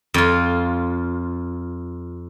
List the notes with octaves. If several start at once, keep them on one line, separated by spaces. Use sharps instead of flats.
F2 F4